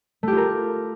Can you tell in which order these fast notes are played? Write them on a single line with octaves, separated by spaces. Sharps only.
A3 G4 F4 A#4